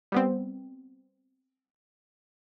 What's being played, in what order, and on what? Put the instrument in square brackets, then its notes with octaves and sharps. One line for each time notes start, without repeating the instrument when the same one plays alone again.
[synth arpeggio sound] G3 B3 C4